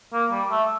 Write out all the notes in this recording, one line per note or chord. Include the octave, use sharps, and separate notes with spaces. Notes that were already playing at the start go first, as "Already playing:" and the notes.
A#3
G3
A3